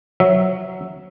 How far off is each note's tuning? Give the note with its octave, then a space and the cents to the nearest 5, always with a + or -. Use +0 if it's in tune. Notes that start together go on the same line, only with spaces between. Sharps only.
F#3 +0 E5 +0